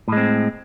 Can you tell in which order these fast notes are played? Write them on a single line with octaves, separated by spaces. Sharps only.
A2 G#3 C4